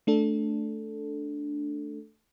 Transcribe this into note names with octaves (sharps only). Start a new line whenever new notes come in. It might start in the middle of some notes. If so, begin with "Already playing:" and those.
A3 D4 A4